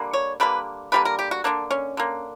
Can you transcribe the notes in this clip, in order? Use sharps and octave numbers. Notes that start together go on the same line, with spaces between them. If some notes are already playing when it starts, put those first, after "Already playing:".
Already playing: D3 G3 A#3
C#5
D3 G3 A#3 B4
D3 G3 A#3 B4
A#4
G4
F#4
D3 A#3 D4
C#4
D3 A#3